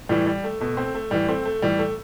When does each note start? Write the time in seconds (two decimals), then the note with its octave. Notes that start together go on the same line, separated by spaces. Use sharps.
0.09 A2 E3 G3
0.26 G3
0.44 A3
0.61 B2 A3
0.77 A3 C4
0.95 A3
1.11 A2 E3 G3
1.28 A3 C4
1.45 A3
1.62 A2 E3 G3
1.79 A3